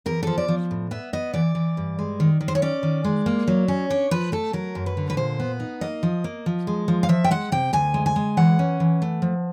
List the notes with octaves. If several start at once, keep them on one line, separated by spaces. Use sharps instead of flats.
E2 A#4
F3 A4
D5
F3
A2
B3 E5
B3 D#5
E3 D5
E3
G2
G#3
D#3
D#3
C5
C#5
C#4 D5
D#3
G#3
A#3
F#3
C#4
D4 C#5
F3 B4
A3 A4
F#3 A#4
F#2
B4
D3
B4
A#2 C5
B3
D#4
A#3 D#5
F3
A#3
F3
G#3
F3
F5
F3 E5
G5
G#3 F#5
C3 G5
D2 G#5
G#3
G#5
G#3
E3 F#5
C#4
E3
A3
F3